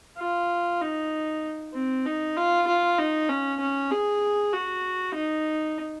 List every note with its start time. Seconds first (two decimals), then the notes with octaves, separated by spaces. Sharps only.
0.19 F4
0.82 D#4
1.74 C4
2.06 D#4
2.37 F4
2.67 F4
2.99 D#4
3.29 C#4
3.60 C#4
3.91 G#4
4.53 F#4
5.15 D#4